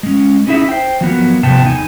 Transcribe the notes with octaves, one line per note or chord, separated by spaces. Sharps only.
G#3 C#4
C#4 D#4 E4 G#4 E5
C5 G5
F3 F#3 B3 A#4
C3 F3 B3 G5 A5
E2 D3 D#4 E4 G#5